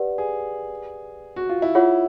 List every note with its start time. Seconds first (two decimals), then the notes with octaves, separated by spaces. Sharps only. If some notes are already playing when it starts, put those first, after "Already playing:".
Already playing: G4 B4 D5 F#5
0.18 G#4
1.36 F#4
1.50 F4
1.62 E4
1.75 F4 G#4 C#5 F#5